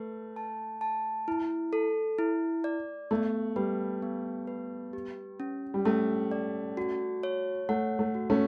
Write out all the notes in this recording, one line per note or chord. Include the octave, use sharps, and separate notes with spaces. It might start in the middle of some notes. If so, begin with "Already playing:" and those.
Already playing: A3 B4
A5
A5
E4
A4
E4
D5
A3 B3
G3 B4
B3
B4
G4
C#4
G3
A3 C#4
D5
F#4
C#5
A3 F#5
A3
F#4
A3 C#4